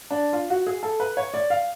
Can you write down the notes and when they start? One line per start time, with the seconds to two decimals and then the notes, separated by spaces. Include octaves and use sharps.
0.11 D4
0.33 F4
0.50 F#4
0.67 G#4
0.83 A4
1.00 B4
1.17 C#5
1.34 D5
1.50 F5